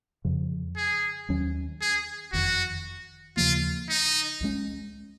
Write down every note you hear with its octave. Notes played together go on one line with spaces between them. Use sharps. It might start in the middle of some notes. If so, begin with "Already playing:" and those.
F2 C#3 F3
G#4
D#2 D#3 F#3 C#4
G#4
F#1 F2 D#3 F#4
D#2 C#3 F3 A#3 F4
D#4
C#2 C#3 G#3 C#4